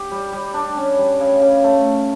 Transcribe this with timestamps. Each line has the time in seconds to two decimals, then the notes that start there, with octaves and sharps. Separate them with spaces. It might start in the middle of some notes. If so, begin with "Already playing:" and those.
Already playing: G4
0.12 G3
0.33 G3
0.54 D4
0.77 C#4
0.99 G3
1.20 C#3
1.42 C#3
1.64 A3